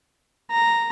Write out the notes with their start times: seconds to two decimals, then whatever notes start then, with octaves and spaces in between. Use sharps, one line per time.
0.51 A#5